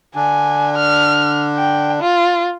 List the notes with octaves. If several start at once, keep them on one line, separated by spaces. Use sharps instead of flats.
D3 D4 G#5
F6
G5
F4